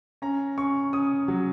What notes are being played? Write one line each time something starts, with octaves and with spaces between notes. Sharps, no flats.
C#4 A#5
C#4 C#6
C#4 D#6
F#3